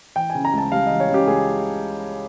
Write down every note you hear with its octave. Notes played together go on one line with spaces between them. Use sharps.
E3 G5
G#5
C#3
A#5
C#2 A5
G3 F5
E3 D#5
C#5
C#3 G4
C#2 G#4